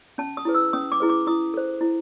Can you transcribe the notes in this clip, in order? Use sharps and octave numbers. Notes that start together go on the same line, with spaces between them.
C#4 A5
D#6
E4 G#4 B4
E6
C#4 D#6
D6
E4 G#4 B4
D6
E4 D#6
A4 C5
E4